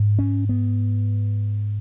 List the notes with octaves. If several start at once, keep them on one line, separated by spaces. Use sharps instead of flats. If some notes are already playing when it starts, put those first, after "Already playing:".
Already playing: G#2
C#4
B3